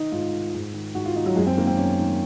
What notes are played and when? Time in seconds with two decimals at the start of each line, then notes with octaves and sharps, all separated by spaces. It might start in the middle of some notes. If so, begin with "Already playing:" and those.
Already playing: D#3 D#4
0.12 G#2 F4
0.33 D#3
0.54 G#2
0.74 D#3
0.95 G#2 F#4
1.05 F4
1.15 D#3 D#4
1.26 F#3
1.36 F#2 G#3
1.47 C4
1.57 D#3 A#3
1.67 C4
1.77 F#2 C#4
1.99 D#3